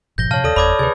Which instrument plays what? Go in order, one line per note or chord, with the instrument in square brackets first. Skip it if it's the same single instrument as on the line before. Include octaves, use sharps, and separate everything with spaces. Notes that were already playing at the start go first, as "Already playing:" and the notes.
[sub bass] G1 [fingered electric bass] G2 A#2 F3 [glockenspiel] G6 A#6 G7
[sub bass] C3 [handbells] C#5 F5 [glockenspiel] A5 F6
[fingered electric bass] D#2 [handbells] A4 D5 D#6
[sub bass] F#1 [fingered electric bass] E2 [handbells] C#5 D5 D#6 [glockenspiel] B5 D6 G#6
[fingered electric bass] D2 [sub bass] C3 [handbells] G#4 B4 [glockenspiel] G#6